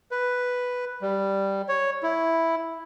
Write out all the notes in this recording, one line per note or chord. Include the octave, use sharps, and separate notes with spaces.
B4
G3
C#5
E4